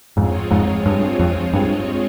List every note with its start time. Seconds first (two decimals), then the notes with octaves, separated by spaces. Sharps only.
0.17 F2 G#2 G#3 C4 F4 G#4 C#5
0.51 F2 G#2
0.86 G2
1.20 F2
1.53 G2